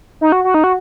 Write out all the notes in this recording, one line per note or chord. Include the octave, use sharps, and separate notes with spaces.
D#4
F#4
F#4
D#4
F#4